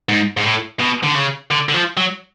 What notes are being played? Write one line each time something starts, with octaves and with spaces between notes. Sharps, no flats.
G#2
G#2
A2
B2
D3
C#3
D3
D3
F3
F#3